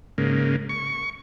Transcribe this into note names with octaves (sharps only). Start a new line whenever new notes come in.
G#2 C#3 A#3
C#6